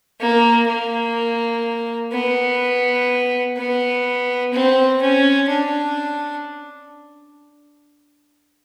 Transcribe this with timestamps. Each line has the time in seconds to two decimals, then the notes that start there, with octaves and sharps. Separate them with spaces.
0.21 A#3
0.68 A#3
2.13 B3
3.57 B3
4.53 C4
5.02 C#4
5.49 D4